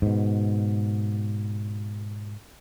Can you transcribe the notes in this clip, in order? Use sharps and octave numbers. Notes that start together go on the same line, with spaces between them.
G#2 B2